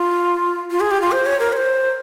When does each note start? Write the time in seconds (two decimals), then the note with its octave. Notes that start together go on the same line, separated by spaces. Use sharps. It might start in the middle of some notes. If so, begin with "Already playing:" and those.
Already playing: F4
0.71 F4
0.80 G#4
0.91 G4
1.02 F4
1.12 C5
1.26 C#5
1.39 A#4
1.53 C#5
1.57 C5